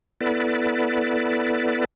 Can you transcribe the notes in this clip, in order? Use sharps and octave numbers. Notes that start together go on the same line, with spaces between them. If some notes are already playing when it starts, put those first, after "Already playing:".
B3 E4 A4 B4 D5